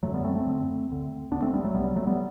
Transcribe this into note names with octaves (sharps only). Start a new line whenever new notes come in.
F#2 D3 F#3 A3
G3 B3
A3 C4
A3 C4
F#2 D3
D2 D3
D2 D3 B3 D4
A3 C4
G3 B3
F#3 A3
C2 C3 G3 B3
F#3 A3
G3 B3